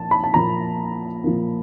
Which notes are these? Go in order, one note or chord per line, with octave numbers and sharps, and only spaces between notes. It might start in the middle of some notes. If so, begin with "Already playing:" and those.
Already playing: A#2 F3 A#3 A5
B5
A5
A#2 F3 A#3 A#5
A#2 F3 A#3